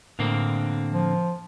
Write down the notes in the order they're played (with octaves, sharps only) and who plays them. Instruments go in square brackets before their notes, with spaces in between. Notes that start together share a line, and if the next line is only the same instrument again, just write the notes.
[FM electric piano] A2 [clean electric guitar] D3 A#3 C4
[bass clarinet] F3